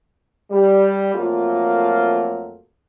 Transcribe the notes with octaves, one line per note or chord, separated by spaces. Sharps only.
G3
F2 F#3 A3 A#3 F4